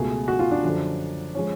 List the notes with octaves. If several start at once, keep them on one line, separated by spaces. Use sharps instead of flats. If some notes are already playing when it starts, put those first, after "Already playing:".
Already playing: C#2 B2 A3 G#4
F#4
F4
D4
F#2 D3 F3
F3 G#3 C#4